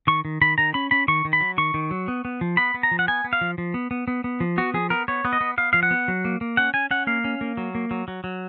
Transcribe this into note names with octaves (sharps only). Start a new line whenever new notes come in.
D#3 C#6
D#3
D#3 B5
D#3 A#5
C#4 B5
C#4 B5
D#3 C#6
D#3
B5
F#3
D#3 C#6
D#3
F#3
B3
B3
F3
B3 B5
B3
A#5
F3
F#5
B3 G#5
B3
F5
F3
F3
B3
B3
B3
B3
F3
B3 F#4
F3 G#4
B3 A#4
B3 C#5
B3
D#5
B3
B3 F5
F3 F5
F#5
B3
F#3
A#3
A#3
C#4 F#5
C#4 G#5
C#4 F#5
A#3 F5
C#4
A#3
F#3
A#3
F#3
F#3
F#3